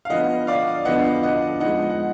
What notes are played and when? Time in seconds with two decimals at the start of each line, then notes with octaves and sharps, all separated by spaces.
0.05 F5
0.10 D3 F3 B3 D#5 F#5
0.47 D5 F5
0.85 D3 F3 B3 D#5 F#5
1.23 D#5 F#5
1.60 F3 G#3 B3 D#4 D#5 F#5
1.90 F#5